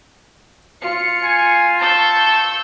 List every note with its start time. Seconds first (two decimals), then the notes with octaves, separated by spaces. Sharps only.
0.81 F4 C#7
1.24 G#5
1.82 A5 C#6 E6 G6